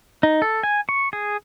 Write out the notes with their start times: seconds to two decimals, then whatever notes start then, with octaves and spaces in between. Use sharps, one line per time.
0.23 D#4
0.42 A4
0.63 G#5
0.89 C#6
1.13 G#4